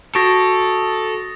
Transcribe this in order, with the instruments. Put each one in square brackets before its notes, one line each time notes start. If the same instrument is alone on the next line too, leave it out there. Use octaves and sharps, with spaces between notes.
[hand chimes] F#4 C#6 D7 [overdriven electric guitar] A4 [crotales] D#6 A6 A#6